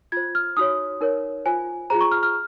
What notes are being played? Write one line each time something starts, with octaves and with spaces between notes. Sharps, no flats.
F4 C5 G#6
F6
D#4 F#4 C#5 D#6
D#4 A#4 C#5
F4 C5 G#5
F4 G#4 C5 A#5
C#6
F6
F6